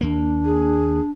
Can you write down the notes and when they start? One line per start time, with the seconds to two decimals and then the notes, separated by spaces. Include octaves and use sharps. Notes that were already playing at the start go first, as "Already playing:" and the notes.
0.01 D#2 A#3 D4
0.45 G#4